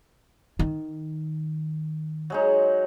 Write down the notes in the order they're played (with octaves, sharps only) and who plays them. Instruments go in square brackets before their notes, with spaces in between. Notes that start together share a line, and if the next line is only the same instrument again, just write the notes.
[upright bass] D#3
[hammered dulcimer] F#3 G#3 D#4